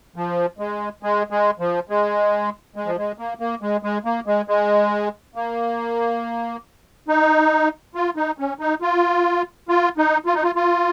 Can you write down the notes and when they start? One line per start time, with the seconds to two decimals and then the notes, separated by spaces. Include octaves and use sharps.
0.16 F3
0.59 G#3
1.03 G#3
1.30 G#3
1.59 F3
1.89 G#3
2.76 G#3
2.86 F3
2.97 G#3
3.19 A#3
3.40 A#3
3.62 G#3
3.83 G#3
4.05 A#3
4.26 G#3
4.48 G#3
5.35 A#3
7.08 D#4
7.95 F4
8.16 D#4
8.38 C#4
8.59 D#4
8.82 F4
9.69 F4
9.97 D#4
10.26 F4
10.35 D#4
10.43 F4
10.55 F4